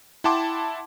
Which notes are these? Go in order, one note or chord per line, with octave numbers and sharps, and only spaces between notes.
E4 F#5 G5 A5 C6 D6